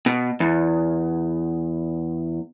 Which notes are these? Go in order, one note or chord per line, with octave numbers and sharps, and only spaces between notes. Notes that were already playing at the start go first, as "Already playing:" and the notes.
B2
E2